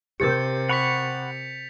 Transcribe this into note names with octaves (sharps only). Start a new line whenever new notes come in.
C3 G4 A#4 G6 A6 C#7
F#5 B5 C#6 B6 C#7 F7